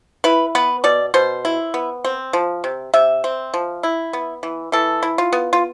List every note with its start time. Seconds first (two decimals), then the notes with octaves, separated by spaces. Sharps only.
0.24 E4 B4
0.55 B3 B4
0.84 B2 D5
1.14 B2 C5
1.45 E4
1.74 B3
2.04 C4
2.33 F3
2.64 C3
2.94 C3 E5
3.24 C4
3.54 F3
3.83 E4
4.13 B3
4.43 E3
4.72 E3 A4
5.03 E4
5.18 F4
5.33 B3
5.53 F4